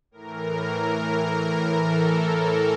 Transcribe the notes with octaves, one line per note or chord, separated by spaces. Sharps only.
A2 E3 A#4
A4